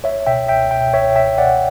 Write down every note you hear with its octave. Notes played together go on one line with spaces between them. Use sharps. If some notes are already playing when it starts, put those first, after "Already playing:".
C#2 C#5 E5
B2 E5 G5
C#2 E5 G5
B2 E5 G5
C#2 C#5 E5
B2 E5 G5
C#2 D5 F#5